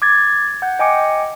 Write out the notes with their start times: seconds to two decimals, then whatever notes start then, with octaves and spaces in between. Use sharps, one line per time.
0.02 D6 G#6 A6
0.62 F#5 G6
0.79 D#5 G5 G#5 D6 C#7